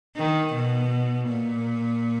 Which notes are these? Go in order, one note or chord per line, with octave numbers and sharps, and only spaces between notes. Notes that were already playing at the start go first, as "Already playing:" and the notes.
D#3
B2
A#2